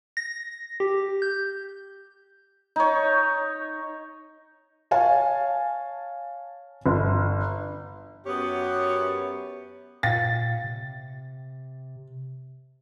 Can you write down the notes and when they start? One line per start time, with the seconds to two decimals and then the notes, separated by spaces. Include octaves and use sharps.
0.17 A#6
0.80 G4
1.22 G6
2.76 D#4 C#5
4.91 C#5 F5 G#5 A5
6.86 G1
8.26 F#2 B3 G4 C#5
10.03 A#2 F5 G5 A6
10.64 C3